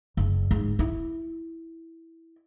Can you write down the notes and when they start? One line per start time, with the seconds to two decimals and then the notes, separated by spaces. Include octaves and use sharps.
0.17 F#1
0.51 G#2
0.79 E4